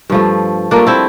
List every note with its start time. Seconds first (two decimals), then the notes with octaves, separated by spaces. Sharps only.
0.10 G2 F3 A3
0.71 G2 F3 A3 A#3 D4
0.87 C4 E4